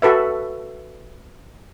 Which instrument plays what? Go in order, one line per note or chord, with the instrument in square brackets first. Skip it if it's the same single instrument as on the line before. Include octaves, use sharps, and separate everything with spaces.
[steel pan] F#4 A4 B4 E5